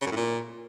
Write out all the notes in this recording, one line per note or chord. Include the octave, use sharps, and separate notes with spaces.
C#3
F#2
A2
A#2